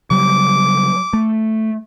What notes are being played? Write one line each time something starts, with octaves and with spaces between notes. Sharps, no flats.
C#3 F#3 G3 D6
A3